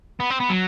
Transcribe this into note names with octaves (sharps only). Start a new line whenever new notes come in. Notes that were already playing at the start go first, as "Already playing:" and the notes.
B3
C4
B3
F#3